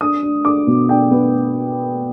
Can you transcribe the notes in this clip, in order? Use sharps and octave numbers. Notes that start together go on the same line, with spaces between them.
D4 D#6
D4
D4 D6
B2
D4 G5
B3